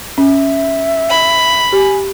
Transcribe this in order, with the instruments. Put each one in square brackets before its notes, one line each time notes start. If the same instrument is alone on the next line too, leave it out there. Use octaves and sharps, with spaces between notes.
[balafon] C#4 [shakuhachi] E5
[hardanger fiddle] B5
[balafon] G4 [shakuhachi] G#5